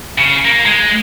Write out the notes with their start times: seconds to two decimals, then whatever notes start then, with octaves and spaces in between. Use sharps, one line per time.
0.19 C#3
0.45 A#3
0.66 G#3